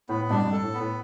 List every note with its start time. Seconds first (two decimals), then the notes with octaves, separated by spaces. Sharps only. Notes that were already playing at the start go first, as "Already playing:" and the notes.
0.09 A2 B3
0.21 A2
0.30 G2 B2 D4
0.47 G2
0.52 A4
0.63 A2
0.74 B3
0.80 A2